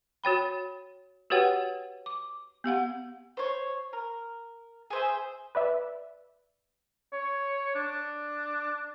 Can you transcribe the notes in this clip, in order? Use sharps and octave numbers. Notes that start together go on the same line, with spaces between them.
F#4 C#5 G5 B5
F#4 G4 B4 C#5 F#5 G5
D6
B3 G4 F5 F#5
C5 C#5
A#4
G#4 C5 E5
B4 D5 E5
C#5
D4